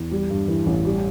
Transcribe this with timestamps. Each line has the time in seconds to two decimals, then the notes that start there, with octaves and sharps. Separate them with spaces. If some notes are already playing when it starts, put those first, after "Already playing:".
Already playing: E2
0.11 G3
0.30 G2
0.48 E3
0.66 A1
0.85 G3